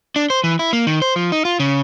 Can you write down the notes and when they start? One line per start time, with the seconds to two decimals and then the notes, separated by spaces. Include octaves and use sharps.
0.16 D4
0.30 C5
0.44 E3
0.59 E4
0.73 A#3
0.87 D#3
1.02 C5
1.16 F3
1.32 D#4
1.45 F4
1.60 C#3